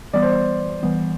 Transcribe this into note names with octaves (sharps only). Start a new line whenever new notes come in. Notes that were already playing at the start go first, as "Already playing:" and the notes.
E3 G3 B3 D5
C5
D5
E3 G3 B3